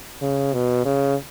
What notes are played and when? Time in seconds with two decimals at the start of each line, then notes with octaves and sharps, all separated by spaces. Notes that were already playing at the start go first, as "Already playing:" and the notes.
0.22 C#3
0.54 B2
0.86 C#3